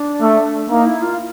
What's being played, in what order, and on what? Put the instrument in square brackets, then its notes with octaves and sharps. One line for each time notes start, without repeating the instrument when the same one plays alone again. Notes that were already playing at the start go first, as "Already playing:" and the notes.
Already playing: [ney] D4
[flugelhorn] A3
[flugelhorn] A#3 [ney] D#4
[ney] E4
F4